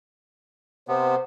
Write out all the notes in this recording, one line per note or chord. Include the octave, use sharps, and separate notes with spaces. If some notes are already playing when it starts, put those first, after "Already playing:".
C3 B3 C5